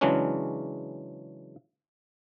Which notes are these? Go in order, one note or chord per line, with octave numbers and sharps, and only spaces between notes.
C#3 E3 F#3 G#3 C#4 D4